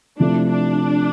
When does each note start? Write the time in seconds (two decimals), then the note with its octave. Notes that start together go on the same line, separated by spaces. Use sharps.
0.19 C3 F3 A3 D4 E4
0.49 D4